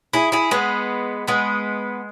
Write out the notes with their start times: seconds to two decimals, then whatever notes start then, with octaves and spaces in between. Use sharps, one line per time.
0.13 E4 G#4
0.32 E4 G#4
0.51 G#3 B3
1.28 G#3 B3